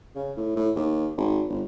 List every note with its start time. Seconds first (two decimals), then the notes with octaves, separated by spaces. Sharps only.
0.16 C#3
0.37 A2
0.56 A2
0.76 D#2
1.17 G#1
1.49 G1